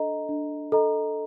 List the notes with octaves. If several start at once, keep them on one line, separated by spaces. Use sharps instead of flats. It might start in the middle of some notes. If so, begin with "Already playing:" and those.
Already playing: D4 A4 D#5 A#5
D4
A4 D#5 A#5